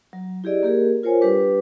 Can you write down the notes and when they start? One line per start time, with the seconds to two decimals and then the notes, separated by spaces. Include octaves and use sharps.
0.13 F#3
0.44 E4 G4 G#4 D5 D#5
0.63 A#3 G4 G#4 A#4
1.03 F4 A#4 C5 C#5 G#5
1.21 G3 D4 G4 B4 D6